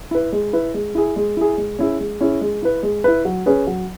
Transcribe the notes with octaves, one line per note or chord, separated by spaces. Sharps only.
E4 B4
G#3
E4 B4
G#3
E4 G#4
G#3
E4 G#4
G#3
C#4 E4 G#4
G#3
C#4 E4 G#4
G#3
E4 B4
G#3
E4 B4
F#3
C#4 G#4 B4
F#3